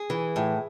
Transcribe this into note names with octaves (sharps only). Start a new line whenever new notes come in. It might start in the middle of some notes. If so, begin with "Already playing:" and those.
Already playing: G#4
E3
A2